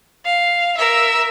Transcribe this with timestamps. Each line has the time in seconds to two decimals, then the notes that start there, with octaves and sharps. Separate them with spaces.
0.25 F5
0.77 A#4 E5